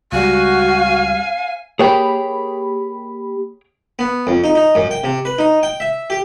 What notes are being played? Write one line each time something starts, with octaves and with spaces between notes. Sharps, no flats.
C#2 G3 F#4 F5 G#5
A#3 G4 G#4 C#5 G5 B5
B3
F2
D#4
D#4
F#2
G5
C3
B4
D#4
G5
E5
G4